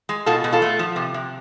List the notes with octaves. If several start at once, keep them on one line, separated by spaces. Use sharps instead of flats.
G#3
B2 F4 A4
B2
F4 A4
A3
F3
C3
C3